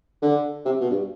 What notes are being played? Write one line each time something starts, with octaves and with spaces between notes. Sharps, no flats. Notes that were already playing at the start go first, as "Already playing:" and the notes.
D3
C3
B2
G2